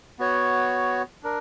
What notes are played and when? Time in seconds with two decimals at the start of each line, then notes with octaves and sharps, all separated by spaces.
0.19 B3 F#4 C#5
1.23 D4 A#4